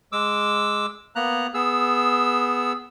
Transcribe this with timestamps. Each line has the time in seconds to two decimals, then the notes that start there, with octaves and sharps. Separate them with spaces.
0.12 G#3 D6 E6
1.16 A#3 B3 A#5 F#6
1.54 B3 G#4 E6